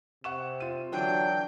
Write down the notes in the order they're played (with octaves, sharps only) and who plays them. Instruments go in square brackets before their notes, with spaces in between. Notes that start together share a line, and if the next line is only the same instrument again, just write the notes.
[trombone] C3 [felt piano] F#5 C#6 E7
[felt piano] F4 D#7
[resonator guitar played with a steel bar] D3 E3 D4 [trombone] F#3 [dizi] G5